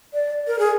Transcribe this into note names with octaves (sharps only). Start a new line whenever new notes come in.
D5
A#4
G#4